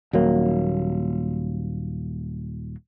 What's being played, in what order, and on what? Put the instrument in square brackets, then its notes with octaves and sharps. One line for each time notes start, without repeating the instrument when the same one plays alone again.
[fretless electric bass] D#1 F#3 A#3